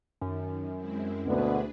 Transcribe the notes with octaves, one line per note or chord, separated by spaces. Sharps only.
F#2 D#3
G#3 C4 E4
D2 B2 D3 B3 D4 G#4 B4